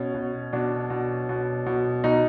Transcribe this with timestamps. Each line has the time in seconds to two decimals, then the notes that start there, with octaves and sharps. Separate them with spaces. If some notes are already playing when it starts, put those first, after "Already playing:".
Already playing: B2 C#4
0.14 B2
0.53 B2 D4
0.90 B2
1.29 B2
1.66 B2
2.04 B2 D#4